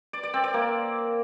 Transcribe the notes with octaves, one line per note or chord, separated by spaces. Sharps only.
D5
D5
C4
D5
A#3